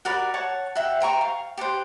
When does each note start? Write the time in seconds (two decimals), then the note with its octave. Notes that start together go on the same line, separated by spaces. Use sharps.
0.05 F#4 A#4 D5 B5
0.34 C#5 F#5 A5 C#6
0.75 F#4 E5 G5
1.00 C5 G5 A#5 C#6
1.21 F5
1.57 G4 A4 B4 C5